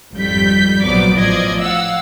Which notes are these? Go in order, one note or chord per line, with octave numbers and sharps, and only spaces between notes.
G#1 F2 G3 G6 B6
A#1 F3 F#3 B3 D5 D6
A1 F3 D5 D#5 G#6
F5 F#5 E6